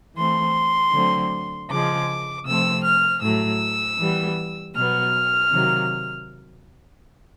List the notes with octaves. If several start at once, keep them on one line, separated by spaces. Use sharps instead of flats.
E3 A3 C4 C6
D3 F#3 A3 C4
C#3 F3 G#3 D6
C3 F3 A3 C4 E6
F6
A2 F#3 A3 E6
E3 G3 B3
B2 F#3 B3 F6
C3 D#3 F#3 A#3